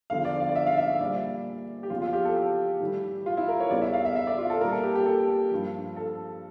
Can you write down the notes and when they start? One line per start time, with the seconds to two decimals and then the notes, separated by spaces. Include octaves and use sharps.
0.10 E2 D3 F3 F5
0.25 D5
0.40 F5
0.49 D5
0.55 E5
0.67 F5
0.77 E5
0.89 F5
1.01 A#2 G3 D5
1.83 G4
1.90 E2 C#3 F3 F4
2.02 F4
2.13 G4
2.25 A4
2.36 G4
2.80 A2 E3 G3
3.26 F4
3.37 E4
3.48 A#4
3.60 C#5
3.70 E2 C#3 G3 D5
3.82 E5
3.93 F5
4.05 E5
4.16 E5
4.27 D5
4.38 F4
4.50 A4
4.61 A#2 G3 A#4
4.72 A4
4.83 G4
4.95 G4
5.06 A4
5.51 G2 F3
5.97 A4